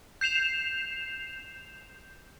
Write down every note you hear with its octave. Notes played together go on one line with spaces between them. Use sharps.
G6 C7 E7 F7